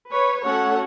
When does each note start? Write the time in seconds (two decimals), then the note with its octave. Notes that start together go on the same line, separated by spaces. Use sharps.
0.12 B4 C#5
0.46 A3 C#4 F#4 A4 C#5 F#5